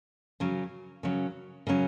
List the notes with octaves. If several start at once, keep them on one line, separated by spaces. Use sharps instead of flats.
C#3 F#3 C#4
C#3 F#3 C#4
C#3 F#3 C#4